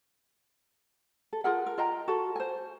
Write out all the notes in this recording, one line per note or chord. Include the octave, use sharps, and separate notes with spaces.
A4
F4 G#4 A#4 F#5
A#4
F4 D#5 G5 A#5
F#4 A4
C5 G#5